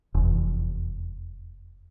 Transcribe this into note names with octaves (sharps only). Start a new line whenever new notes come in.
F1 E2